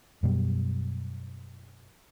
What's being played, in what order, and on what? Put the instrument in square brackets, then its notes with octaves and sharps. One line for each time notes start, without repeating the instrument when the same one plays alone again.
[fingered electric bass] F#2 B2 G3